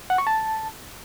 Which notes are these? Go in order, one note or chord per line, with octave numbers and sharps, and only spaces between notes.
F#5
C#6
A5